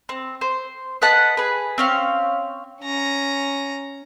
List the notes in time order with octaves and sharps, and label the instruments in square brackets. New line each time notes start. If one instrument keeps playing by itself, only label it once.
[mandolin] C4
C5
B4 D#5 F#5 A5
G#4 B4
C4 C#4 F5
[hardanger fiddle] C#4 A#5